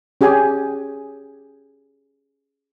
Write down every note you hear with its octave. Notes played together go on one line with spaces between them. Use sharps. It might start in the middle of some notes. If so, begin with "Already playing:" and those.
C#4 G4 G#4 G#5